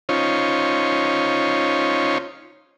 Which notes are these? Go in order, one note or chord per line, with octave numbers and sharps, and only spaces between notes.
C#4 D#4 F4 C5 C#5